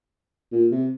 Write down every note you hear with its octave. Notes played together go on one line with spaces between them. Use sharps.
A#2
C3